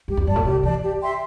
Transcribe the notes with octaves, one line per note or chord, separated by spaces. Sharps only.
G2 G4
E2
G2 D5 A5
A2
C3 G4
E3 D5 A5
G4
E5 G5 C6